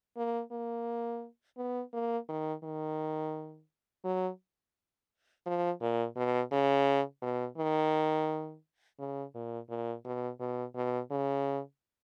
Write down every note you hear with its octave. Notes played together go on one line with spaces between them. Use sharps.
A#3
A#3
B3
A#3
D#3
D#3
F#3
F3
A#2
B2
C#3
B2
D#3
C#3
A#2
A#2
B2
B2
B2
C#3